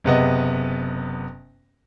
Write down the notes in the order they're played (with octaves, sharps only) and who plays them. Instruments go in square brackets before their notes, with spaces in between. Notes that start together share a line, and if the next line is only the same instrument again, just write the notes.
[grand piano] F#1 C3 B3 D#5